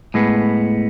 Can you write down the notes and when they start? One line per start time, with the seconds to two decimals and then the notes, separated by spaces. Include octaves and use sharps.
0.14 A2 G#3 B3